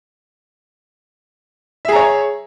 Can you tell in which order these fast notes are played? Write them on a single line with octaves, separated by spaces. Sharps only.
E5 G#4 A#5 C#5